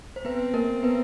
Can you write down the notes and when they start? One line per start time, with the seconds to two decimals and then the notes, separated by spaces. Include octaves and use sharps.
0.16 C5
0.25 B3 C4 B4
0.54 A#3 A#4
0.83 B3 B4